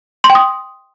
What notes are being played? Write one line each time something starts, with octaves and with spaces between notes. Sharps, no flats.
C6
G5
D#6